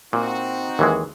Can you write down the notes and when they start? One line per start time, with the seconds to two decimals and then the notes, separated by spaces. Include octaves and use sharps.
0.13 A#2 C4 D#4 F#4
0.79 D#2 E3 G#3